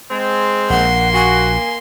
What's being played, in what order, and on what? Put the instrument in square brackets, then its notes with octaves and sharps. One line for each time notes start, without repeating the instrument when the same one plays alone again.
[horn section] G#3 C4
[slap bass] A#1 [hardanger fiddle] A#3 C6 [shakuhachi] F#5
[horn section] F#4 [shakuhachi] G#5